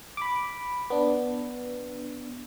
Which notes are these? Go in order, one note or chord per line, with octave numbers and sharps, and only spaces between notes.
B5 D6
B3 D4